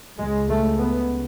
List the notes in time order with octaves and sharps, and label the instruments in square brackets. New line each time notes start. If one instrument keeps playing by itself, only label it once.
[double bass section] C#2 C#3 G#3
A3
B3